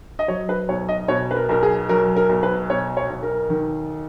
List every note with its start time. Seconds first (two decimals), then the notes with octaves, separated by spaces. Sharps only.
0.19 D#5
0.28 F#3 C#5
0.49 B4
0.69 B1 C#5
0.89 D#5
1.08 B2 C#5
1.31 B4
1.36 A#4
1.49 B1 A#4
1.63 G#4
1.89 F#3 A#4
2.16 A#4
2.29 B1
2.43 B4
2.70 B2 C#5
2.97 C#5
3.10 B1
3.23 A#4
3.50 D#3